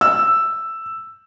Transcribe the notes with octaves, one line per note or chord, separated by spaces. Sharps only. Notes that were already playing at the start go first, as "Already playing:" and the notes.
E6